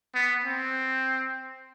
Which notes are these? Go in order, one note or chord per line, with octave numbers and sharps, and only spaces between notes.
B3
C4